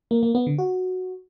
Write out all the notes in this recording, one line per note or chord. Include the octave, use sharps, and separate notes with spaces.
A#3
A#3
B3
D3
F#4